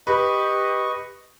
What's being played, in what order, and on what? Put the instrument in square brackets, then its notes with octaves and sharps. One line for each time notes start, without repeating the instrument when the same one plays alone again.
[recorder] G4 [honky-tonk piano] B4 [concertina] D#5 C#6